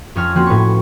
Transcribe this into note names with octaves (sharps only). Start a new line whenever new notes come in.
F2 C#4 C#5 A5 F6
F3 A#3 C4 C#4 F#4
A2 B4 C#5 C#6